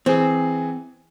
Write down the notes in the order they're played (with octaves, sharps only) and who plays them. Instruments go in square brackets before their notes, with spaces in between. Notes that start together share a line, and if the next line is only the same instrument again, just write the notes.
[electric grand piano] E3 G#4 [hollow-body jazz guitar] C4